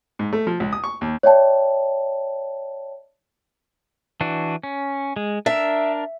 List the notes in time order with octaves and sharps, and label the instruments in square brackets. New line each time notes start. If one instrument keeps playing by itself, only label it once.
[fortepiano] G#2
A3
F3
C#2
D#6
C#6
D#2
[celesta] C#5 D5 E5 G5 A5
[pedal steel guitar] E3 D4 F#4
C#4
G#3
[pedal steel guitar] D4 A#4 [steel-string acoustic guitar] E5